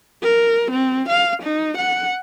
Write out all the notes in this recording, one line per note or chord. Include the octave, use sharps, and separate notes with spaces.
A#4
C4
F5
D#4
F#5